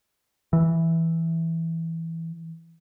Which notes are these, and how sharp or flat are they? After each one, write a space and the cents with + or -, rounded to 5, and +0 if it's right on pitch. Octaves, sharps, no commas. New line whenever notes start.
E3 -5